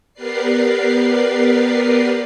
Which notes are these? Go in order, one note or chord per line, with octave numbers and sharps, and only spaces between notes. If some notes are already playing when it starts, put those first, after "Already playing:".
B3 G4 A#4 B4 D5 C7